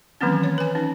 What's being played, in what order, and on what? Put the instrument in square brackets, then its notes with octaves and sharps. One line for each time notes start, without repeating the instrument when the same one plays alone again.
[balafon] D#3 E3 F#3 A#3 C4 C#4
C#5
B4 G#5
C#4 D#4